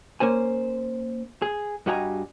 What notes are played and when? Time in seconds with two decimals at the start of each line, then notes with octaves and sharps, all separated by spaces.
0.20 A#3 C#4 C5 G#5
1.42 G#4
1.86 G2 G3 F#4 D#5 G#5 A#5